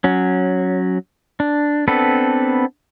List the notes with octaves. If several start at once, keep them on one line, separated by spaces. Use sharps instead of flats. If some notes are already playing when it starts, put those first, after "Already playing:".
F#3 C#4
D4
B3 C4 D4 A4 B4